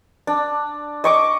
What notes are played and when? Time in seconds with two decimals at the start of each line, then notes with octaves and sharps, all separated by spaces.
0.27 D4
1.04 D#5 C#6 D6